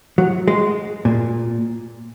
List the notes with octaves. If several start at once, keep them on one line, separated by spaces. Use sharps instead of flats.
F#3
G#3
A#2